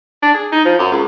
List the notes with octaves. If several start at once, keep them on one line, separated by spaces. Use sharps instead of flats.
D4
G#4
D#4
F3
F#2
C#2